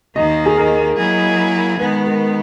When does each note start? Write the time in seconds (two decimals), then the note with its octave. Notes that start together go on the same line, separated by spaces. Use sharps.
0.16 D#2 D#3 A#3 D#5
0.46 G#4
0.58 A#4
0.97 F#3 A#3 E4 G#4
1.79 D#3 G#3 B3 B4
2.06 A#4